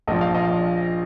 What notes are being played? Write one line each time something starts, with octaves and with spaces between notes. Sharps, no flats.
A#1 A#2 F3 D#5
F5
D#5
F5